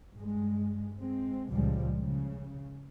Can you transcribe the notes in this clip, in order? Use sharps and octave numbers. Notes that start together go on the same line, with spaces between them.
G2 G#3
G#3 C4
C#2 A#2 F3 G3 G#3
C#3